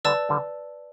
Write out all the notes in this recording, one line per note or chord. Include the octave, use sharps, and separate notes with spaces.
D3 G3 B4 D5 A5 E6
D3 G3